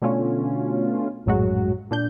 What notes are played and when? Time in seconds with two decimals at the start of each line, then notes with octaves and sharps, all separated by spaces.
0.02 B2 D3 A3 C#4 F4
1.26 A#1 F#2 A2 F#3 G#3 F#4
1.91 A#2 D4 G6